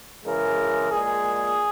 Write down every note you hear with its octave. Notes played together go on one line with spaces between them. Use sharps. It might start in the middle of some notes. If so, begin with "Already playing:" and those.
C#3 E3 G#3 A#4
A#2 G#3 G#4